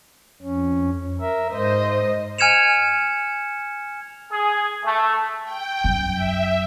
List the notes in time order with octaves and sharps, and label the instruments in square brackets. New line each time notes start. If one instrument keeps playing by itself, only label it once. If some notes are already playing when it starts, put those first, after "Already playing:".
[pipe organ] F2 C#4
A#4 E5
[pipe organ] G#2 [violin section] C5 D#5
[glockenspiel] G#5 F6 G#6 C#7 E7 F7
[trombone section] G#4
A3
[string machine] G5
[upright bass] F#2
[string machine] E5